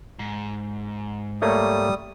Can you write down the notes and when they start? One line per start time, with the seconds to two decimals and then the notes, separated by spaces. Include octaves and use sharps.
0.19 G#2
1.42 G3 A3 A#3 C#5 D#6